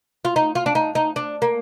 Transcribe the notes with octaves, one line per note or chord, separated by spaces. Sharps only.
F4
D#4
F4
D4
D#4
D#4
D4
A#3